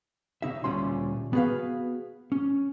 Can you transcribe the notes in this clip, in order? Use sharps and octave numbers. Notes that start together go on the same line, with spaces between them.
C#3 D#4 E5
D2 A#2 G3 C#4 C6
B3 F#4 G#4 B4 F5
C#4